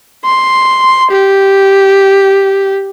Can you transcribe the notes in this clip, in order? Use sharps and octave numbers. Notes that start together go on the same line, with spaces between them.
C6
G4